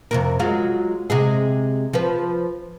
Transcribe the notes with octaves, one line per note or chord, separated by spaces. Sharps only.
F2 C3 A#4
F#3 G#3 F4
C3 G#3 G#4
F3 B4